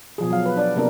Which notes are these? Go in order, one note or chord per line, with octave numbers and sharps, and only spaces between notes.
B2 F3 G#4
F#3 F5
B4
D4 D5
C3 A#3 B3 D4 A#4